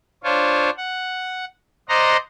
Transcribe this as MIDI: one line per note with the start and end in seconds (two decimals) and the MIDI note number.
0.24 0.70 62
0.24 0.70 65
0.24 0.70 72
0.24 0.70 73
0.77 1.45 78
1.89 2.17 72
1.89 2.17 74
1.89 2.17 75
1.89 2.17 78
1.89 2.17 82
1.89 2.17 84